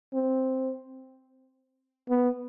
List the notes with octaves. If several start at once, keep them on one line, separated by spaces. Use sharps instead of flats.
C4
B3